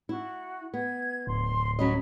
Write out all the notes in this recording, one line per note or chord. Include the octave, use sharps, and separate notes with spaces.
E4 F#4
B3 G#6
D1 C6
F#3 C#4 D#5 B5